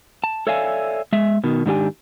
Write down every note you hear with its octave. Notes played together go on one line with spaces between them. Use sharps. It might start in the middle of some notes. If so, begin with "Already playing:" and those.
A5
A4 C#5 D5 E5 F5 G#5
G#3 E5
B2 D#3
G#2 D#3 D4 G4 G#5